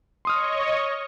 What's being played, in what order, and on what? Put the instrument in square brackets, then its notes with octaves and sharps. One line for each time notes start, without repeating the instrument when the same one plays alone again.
[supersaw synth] C#5 D#5 C#6 [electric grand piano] C6 D#6 F6